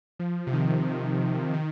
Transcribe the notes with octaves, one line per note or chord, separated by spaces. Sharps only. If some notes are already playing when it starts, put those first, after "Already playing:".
F3
C3
D#3
D#3